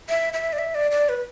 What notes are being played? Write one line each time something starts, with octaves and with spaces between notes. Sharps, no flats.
E5
E5
D5
E5
D5
D5
B4